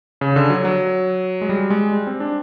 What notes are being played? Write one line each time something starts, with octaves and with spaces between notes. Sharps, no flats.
C#3
D3
F#3
F#3
G#3
G3
G#3
G3
C4
D4